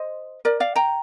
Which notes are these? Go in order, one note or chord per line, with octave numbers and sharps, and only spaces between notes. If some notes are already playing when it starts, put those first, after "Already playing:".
Already playing: C5 D#5
A#4 D5
D5 F5
G5 A#5